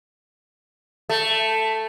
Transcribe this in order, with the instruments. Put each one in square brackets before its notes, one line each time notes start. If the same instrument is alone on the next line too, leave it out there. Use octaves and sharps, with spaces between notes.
[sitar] A3